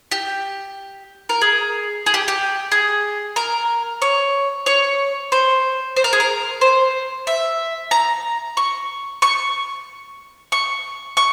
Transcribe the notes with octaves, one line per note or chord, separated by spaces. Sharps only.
G4
A#4
G#4
G#4
G4
G4
G#4
A#4
C#5
C#5
C5
C5
A#4
G#4
A#4
C5
E5
A#5
C#6
C#6
C#6
C#6